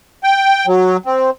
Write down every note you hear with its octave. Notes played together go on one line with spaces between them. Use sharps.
G5
F#3
C4